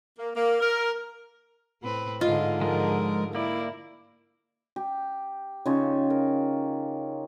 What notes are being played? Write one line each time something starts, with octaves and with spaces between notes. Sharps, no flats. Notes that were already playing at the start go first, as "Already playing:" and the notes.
A#3
A#3
A#4
A2 C4 B4
G#2 D3 F4 D#5
F3 G#3 A#4
A#3 E4 D5
G4
C#3 D#4 F4 C#5
A#4